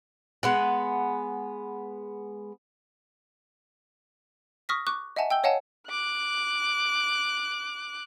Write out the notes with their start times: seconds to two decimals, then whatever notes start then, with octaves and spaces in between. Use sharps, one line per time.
0.43 G#3 B3 F#5
4.69 C#6 D#6 F6 A#6 B6
4.87 C#6 D6 F#6
5.16 D#5 E5 F#5 G#5 A5
5.30 G5 E6 G6 G7
5.44 C#5 D#5 F5 F#5 G#5 A5
5.88 D6 F#6